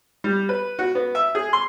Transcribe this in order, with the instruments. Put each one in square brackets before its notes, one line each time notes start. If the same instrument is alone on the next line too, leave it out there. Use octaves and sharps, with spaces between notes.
[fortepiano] G3
B4
F#4
B3
E5
G#4
C6